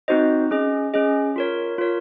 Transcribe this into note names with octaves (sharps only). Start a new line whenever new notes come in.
C4 D#4 F#4 C5 D#5
C#4 G#4 D#5
C#4 G#4 D#5
F4 A#4 C#5
F4 A#4 C#5